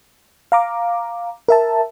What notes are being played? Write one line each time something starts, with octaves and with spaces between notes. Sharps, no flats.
F5 A#5 D6
A#4 E5 A5